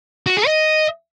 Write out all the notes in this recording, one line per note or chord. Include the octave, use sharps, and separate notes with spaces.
F#4
G#4
D#5